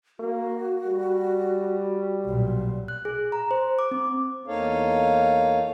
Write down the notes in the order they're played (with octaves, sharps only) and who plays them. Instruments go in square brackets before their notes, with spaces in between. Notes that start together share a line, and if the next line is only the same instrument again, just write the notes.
[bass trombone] A#3 [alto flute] F#4
[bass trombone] G3
[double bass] B1 A#2
[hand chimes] F#6
G#4
A#5
C5
D6
C4
[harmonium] E2 A#3 D#4 A4 C#5 F5